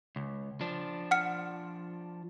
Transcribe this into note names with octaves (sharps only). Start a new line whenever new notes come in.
C#2
F3 D4
F#5 F6 C#7